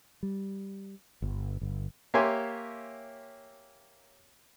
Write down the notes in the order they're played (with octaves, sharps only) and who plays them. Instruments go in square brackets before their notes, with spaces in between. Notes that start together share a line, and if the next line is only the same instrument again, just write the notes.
[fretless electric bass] G3
G1
G1
[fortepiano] A#3 G4 C#5 E5 G#5 C6